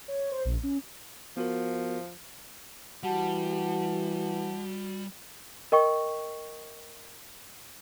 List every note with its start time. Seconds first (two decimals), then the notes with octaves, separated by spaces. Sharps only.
0.08 C#5
0.31 C5
0.45 A#1
0.63 C#4
1.37 F3 B3 F#4 A#4
3.03 E3 G3 F#4 F#5 A5
5.72 A#4 D#5 G5 C#6